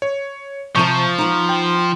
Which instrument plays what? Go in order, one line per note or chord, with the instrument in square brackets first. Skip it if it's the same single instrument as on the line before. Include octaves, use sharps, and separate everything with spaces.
[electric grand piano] C#5
[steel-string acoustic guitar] C3 A5 [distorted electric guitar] F3 [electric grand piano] C#6 G6 D#7
[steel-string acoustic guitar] B3 D#4
[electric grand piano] G5